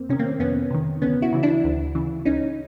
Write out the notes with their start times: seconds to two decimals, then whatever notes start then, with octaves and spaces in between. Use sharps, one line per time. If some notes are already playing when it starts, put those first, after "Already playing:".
Already playing: F2 A#3 C4
0.09 C3 D#3 C#4
0.19 A#3 C4
0.40 F2 B3 C#4
0.70 C3 D#3
1.02 D2 B3 C#4
1.22 E4 F#4
1.33 C#3 E3
1.43 D4 E4
1.64 D2
1.95 C#3 E3
2.25 C#2 C#4 D#4